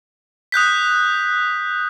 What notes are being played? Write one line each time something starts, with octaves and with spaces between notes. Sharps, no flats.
D#6 F#6 G6 B6